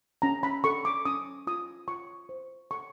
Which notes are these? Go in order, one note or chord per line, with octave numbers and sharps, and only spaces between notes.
C#4 A#5
B5
A4 C#6
D6
C#4 D#6
F4 D#6
F4 C#6
C5
A4 C#6